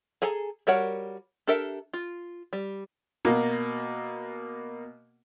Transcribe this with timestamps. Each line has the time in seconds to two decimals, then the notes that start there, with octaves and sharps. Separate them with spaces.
0.22 G#4 A4 G#5 A#5
0.67 G3 F#4 A#4 C#5 F#5
1.47 D4 G4 A4 A#4 E5
1.93 F4
2.53 G3
3.25 B2 A#3